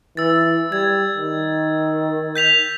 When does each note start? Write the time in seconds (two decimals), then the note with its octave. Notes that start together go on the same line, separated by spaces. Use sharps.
0.17 E3 E6 A6
0.72 G3 G#6
1.17 D#3
2.36 G6 B6 F7